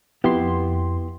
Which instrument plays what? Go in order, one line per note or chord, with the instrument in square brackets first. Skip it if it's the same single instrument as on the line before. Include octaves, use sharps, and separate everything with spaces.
[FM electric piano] F2 C6 [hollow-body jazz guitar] B3 E4 G4